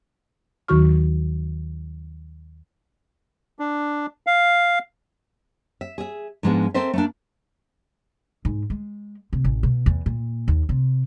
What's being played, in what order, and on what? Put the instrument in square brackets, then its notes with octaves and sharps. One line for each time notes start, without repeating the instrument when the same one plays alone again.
[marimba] D#2 D#3 F#3 F#4 C#6 F6
[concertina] D4
F5
[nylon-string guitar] E5
G#4 E5
G#2 F3 G#3 B3 D4
C4 A4 A#4 C5 D#5 E5
A3 A#3 D4
[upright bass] G#2
G#3
C3
A1
B2
E2
A#2
D#2
C3